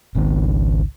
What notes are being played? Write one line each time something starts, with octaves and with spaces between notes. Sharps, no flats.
G#1 C#2 D#3